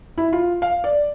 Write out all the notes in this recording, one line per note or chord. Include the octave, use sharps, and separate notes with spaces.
E4
F4
F5
D5